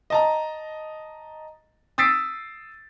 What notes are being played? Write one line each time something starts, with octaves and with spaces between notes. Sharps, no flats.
D#5 A5 A#5
D#6 E6 A6 B6 C7 D7